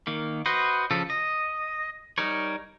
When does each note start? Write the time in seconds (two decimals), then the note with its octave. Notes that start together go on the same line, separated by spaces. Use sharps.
0.07 D#3 A#3
0.46 F#4 B4 C5 D#5
0.91 C#3 F3 A4
1.10 D#5
2.18 G3 D#4 A#4 C#5